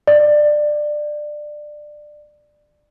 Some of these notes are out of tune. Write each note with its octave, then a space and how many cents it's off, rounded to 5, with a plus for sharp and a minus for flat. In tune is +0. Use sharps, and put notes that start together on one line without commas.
D5 +20